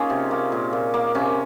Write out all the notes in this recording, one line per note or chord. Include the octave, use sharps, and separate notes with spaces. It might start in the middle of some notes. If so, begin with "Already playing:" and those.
Already playing: A#3 C#4 D#4 F4 G#4
C3
A#3
A#2
A#2
A#3
C3 C#4